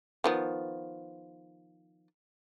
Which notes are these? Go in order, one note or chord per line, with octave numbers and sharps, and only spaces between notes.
D#3 F3 B3